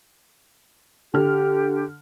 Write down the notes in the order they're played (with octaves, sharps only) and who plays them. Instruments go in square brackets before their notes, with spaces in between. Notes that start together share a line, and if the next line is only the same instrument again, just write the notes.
[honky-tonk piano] D3 F6 [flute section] G4